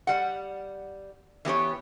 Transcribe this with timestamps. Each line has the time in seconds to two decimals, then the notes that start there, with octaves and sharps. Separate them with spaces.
0.07 G3 F#5
1.45 E3 B3 G4 C#5